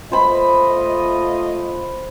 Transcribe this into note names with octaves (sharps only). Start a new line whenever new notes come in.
A3 F4 C5 D#5 B5